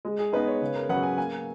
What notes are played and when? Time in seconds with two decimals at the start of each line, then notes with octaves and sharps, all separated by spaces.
0.05 G#3
0.19 G#4
0.33 D#4 B4
0.36 B3
0.47 C#5
0.61 C#3
0.75 A#4
0.89 F#3 C#4 G#4 B4 F#5
1.03 G#5
1.18 A#3 G#5